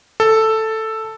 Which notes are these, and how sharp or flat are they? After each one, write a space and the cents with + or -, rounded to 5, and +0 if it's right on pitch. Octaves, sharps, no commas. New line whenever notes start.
A4 +5